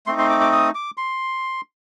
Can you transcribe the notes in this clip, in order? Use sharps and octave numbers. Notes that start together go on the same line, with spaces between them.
A3 C4 D#4 C6
C6
D6
D6
D#6
D6
C6